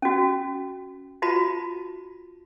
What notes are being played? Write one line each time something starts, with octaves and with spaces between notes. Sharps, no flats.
C#4 F#4
F4 F#4 A5 B5